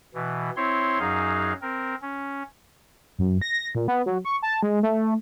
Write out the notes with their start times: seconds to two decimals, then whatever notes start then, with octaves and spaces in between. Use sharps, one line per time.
0.14 B2 E3
0.56 C4 E4 C#5 C6
0.99 F#2 F#3 D#4 G#4 F5
1.62 C4 A#4
2.02 C#4
3.19 F#2
3.42 A#6
3.75 A#2
3.88 B3
4.06 F#3
4.25 C#6
4.42 A5
4.63 G#3
4.83 A3